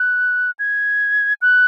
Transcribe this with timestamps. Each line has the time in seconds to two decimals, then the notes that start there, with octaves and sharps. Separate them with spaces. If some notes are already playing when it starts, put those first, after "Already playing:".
Already playing: F#6
0.59 G#6
1.42 F#6